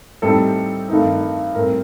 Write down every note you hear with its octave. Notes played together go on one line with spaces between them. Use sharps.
A2 G3 C4 D#4 A4
G2 D#3 A3 C4 D#4
A2 G3 C4 A#4